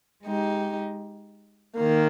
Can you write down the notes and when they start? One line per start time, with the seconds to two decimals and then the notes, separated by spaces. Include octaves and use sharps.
0.23 G#3 D#4 G4
1.76 D#3 A#3